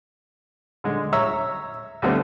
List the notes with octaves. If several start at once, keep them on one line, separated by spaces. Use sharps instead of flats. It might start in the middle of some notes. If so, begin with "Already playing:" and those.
D3 G#3
C#5 E5 A#5 E6
D2 D3 G3 A3 B3 C4